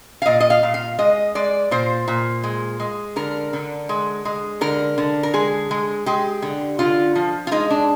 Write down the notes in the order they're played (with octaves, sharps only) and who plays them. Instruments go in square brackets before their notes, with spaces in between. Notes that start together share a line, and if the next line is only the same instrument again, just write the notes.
[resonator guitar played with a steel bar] F5
A#2 D#5
D#5
F5
A#2
F5
G#3 D#5
G#3 D5
A#2 C5
A#2
G#3
G#3
D3 A#4
D3
G#3
G#3
D3 A#4
D3
A#4
G#3 G#4
G#3
G#3 G4
D3
D3 F4
F3
F4
G#3 D#4
D4